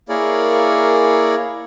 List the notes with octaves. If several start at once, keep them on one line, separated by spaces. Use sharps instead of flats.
A#3 E4 G#4 A#4 C#5 D5